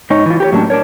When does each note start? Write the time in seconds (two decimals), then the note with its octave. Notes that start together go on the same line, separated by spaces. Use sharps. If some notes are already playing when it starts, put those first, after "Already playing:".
0.10 G#2 D#4 C#5
0.26 E3 F4
0.40 G4 A#4 C#5
0.52 A2 F#3 A#3 C#4 D4 A5
0.70 D4 A#4 C#5